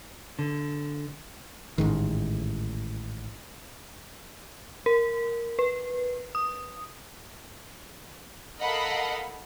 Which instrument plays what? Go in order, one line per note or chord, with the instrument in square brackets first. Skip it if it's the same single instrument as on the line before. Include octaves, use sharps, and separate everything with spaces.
[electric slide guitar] D3
[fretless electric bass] A1 G#2 D#3
[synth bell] A#4
B4
D#6
[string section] A4 A#4 D#5 F5 F#5 B5